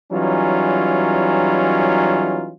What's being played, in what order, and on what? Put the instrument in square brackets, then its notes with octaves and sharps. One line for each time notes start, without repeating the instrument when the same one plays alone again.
[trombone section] E3 F#3 G3 C#4 D#4 F4